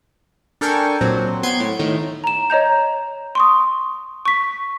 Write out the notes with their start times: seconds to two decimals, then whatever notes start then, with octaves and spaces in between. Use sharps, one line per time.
0.61 D4 A4 A#4 G5 G#5 C#6
1.01 A#2 F#3 C4
1.43 B3 C6 G#6 D7
1.60 A2
1.79 A2 D#3
2.24 A#5 E7
2.50 C#5 D#5 A#5 G6
3.35 C6 C#6 D#6
4.25 C#6 B6